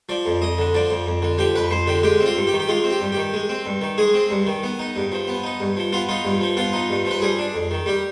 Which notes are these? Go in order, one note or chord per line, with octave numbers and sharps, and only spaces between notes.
F3 D5
F2
F2 D#5
D3
F3 D5
F2
F2
D3
F3 G4
F2 B4
F2 C5
D3 G4
G#3 G4
C4
F4
G2
G4
D#3
G4
G#3 F4
C4
G4
G2
D#3 G4
G#3
C4
G2
D#3
G#3 G#4
C4
G2
D#3
B3
D#4
G2
F3
B3
D#4
G2
F3
B3 F4
D#4 F4
G2
F3
B3 F4
D#4
G2
F3
B4
G3 G#4
D4
F2
D#3
G3 G4